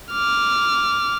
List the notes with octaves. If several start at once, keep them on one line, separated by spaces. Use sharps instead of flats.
D6 F6